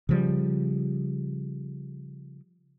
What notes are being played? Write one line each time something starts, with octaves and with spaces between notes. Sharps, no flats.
C#3 F3 G3